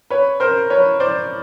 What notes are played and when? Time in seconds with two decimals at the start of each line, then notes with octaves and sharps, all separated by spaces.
0.10 B4 C#5
0.40 A#4 C5
0.70 B4 C#5
1.00 C5 D5